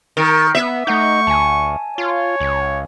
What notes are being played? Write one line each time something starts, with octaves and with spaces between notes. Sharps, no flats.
D#3 A#4
B3 E5
A3 D#4 F#5 C#6 G6
D2 G#5 A5
F4 C#5
C#2